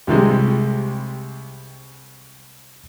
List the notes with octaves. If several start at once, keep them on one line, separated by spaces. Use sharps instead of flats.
C2 C3 G3 G#3